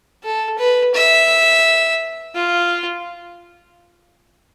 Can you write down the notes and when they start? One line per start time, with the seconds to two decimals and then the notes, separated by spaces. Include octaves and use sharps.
0.23 A4
0.58 B4
0.94 E5
2.35 F4